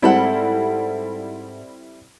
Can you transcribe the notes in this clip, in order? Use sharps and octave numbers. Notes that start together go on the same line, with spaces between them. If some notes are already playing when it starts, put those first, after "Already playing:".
G#2 G3 C4 E4 A4 F#5